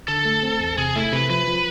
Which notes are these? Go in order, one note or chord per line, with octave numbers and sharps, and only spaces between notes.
D3 A4
A3
C4
E2
C3 G#4
A3 E4
C3 B4
F3 B4
F3